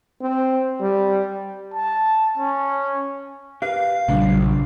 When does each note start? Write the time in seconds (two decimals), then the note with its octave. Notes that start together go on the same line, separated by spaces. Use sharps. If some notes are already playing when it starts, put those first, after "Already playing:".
0.21 C4
0.80 G3
1.74 A5
2.38 C#4
3.62 G4 A#4 B4 F5
4.08 A#1 C#3 F#3 G3 B3 D4